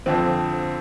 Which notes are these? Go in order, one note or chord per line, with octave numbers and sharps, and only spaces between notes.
F2 D3 F3 C4